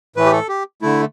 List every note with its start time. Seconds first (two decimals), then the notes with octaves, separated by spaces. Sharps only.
0.16 A2 E3 A3 B4
0.26 G4
0.32 A4
0.49 G4
0.82 D3 A3 E4